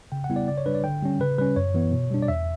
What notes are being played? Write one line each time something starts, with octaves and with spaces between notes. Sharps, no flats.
C#3 G5
F#5
G3 B3 E4
D5
C#3 D5
C#5
G3 D4 B4
D5
D3 G5
G3 C#4
C#3 B4
G3 C#4 B4
F#2 C#5
E3 B3 E4
B2
G3 D4
D5
E2 E5